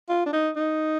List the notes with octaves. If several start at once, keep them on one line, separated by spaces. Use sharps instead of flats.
F4
D4
D#4
D#4